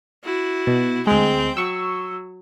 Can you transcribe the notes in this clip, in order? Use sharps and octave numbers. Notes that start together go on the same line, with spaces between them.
E4 F#4
B2
D2 G#3 C4 G5
F#3 C#6 E6